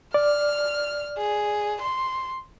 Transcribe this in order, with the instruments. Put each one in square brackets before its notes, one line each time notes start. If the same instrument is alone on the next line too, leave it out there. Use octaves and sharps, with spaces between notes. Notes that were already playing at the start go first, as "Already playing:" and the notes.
[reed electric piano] D5 [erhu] F6
[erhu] G#4
C6